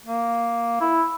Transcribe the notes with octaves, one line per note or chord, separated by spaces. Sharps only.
A#3
E4